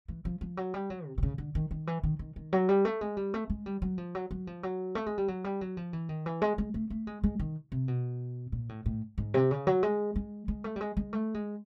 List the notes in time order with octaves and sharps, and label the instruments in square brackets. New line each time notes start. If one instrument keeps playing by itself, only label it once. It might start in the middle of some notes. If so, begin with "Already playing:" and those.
[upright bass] E3
F3
F3
F#3
G3
F#3
C3
C3
C#3
D3
D#3
D#3
E3
D#3
D#3
D#3
F#3
G3
A3
G#3
G3
A3
G#3
G3
F#3
F3
F#3
F#3
F3
F#3
A3
G#3
G3
F#3
G3
F#3
F3
E3
D#3
E3
G#3
G#3
A3
A3
G#3
G#3
D#3
C3
B2
A#2
A2
A2
G#2
C3
C#3
F#3
G#3
G#3
G#3
A3
G3
G#3
G#3
A3
G#3